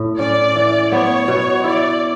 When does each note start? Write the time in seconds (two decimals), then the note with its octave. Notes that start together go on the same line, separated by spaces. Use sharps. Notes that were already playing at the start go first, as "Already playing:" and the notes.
Already playing: A2
0.19 C#4 D5
0.55 E3
0.92 B3 C#5
1.28 B2
1.64 E4 D5